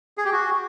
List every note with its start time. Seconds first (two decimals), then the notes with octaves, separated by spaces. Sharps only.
0.18 G#4
0.25 G4
0.32 F#4